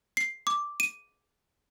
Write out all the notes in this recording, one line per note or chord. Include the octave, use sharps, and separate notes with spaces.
C7
D6
D#7